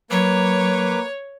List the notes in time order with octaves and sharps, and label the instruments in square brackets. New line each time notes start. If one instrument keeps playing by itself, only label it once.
[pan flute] F#3 [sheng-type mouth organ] A#3 B4 D6 [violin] C#5